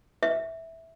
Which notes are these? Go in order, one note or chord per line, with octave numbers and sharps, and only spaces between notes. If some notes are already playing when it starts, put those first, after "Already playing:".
E5